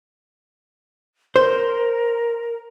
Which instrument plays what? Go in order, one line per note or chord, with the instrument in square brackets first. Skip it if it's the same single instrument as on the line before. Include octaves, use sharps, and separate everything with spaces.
[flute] A#4 [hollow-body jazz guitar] C5